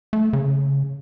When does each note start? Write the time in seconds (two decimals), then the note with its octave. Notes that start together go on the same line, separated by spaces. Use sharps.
0.13 A3
0.33 C#3